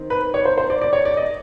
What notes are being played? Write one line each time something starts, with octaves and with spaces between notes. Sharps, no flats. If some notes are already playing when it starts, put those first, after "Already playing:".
Already playing: D#3 C4
B4
C#5
C5
C5
D5
D5
C#5
D5
D#5